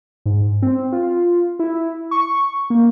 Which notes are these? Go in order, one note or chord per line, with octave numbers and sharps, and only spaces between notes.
G#2
C4
F4
E4
C#6
A#3